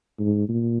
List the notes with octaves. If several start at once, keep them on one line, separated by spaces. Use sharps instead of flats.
G#2
A#2